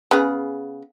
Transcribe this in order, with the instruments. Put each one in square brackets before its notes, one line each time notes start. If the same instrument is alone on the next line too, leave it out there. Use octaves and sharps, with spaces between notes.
[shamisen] C#3 B3 G#4